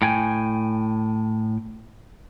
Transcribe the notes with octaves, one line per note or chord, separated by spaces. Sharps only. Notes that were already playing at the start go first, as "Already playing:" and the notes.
A2 G5 G#5